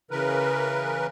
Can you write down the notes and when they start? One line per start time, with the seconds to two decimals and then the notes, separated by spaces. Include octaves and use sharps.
0.11 C#3 E3 A#4 B4